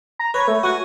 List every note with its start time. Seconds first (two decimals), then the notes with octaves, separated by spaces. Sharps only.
0.19 A#5
0.34 B4 C#5 C#6
0.48 A3
0.63 F#4 F#5 G#5 C#6